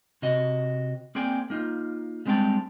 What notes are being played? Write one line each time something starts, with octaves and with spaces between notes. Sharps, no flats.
C3 F#4 D#5
A#3 C4 G#4 D5 G5 G#5
A#3 D#4 F4
G3 G#3 C4 D4 G5 A5